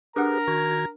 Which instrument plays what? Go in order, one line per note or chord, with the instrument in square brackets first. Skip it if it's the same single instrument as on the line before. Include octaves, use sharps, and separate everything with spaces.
[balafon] D4 F#5 [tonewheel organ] G4 G#4 B4 [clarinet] A#4 [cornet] A#5
[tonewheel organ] D#3 F#4 G#6